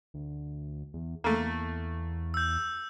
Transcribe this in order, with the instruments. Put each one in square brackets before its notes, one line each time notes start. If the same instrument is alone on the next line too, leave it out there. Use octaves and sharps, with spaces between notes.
[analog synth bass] D2
E2
[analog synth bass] E2 [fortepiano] A3 A#3
[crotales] E6 G6